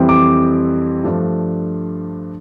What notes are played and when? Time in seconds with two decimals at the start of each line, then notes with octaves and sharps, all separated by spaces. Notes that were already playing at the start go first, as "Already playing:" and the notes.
Already playing: F2 E3 G3 C4
0.09 D6
1.04 G2 F3 A3 D4